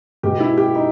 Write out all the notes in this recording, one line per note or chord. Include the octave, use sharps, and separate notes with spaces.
B2 G#3 G4
E4
G4
D#4